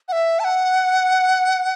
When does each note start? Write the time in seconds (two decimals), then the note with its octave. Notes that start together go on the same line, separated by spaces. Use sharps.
0.08 F#5
0.12 E5
0.40 A5
0.44 F#5